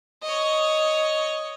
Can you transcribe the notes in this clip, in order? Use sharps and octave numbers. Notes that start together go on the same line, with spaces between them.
C#5 D#5